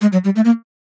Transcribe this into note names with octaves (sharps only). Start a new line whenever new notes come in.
G#3
F#3
G3
A3
A#3